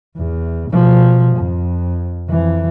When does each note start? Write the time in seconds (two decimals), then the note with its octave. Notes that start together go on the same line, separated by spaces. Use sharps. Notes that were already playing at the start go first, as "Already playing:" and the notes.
0.16 E2
0.71 B2 F3
1.36 F2
2.28 F2 E3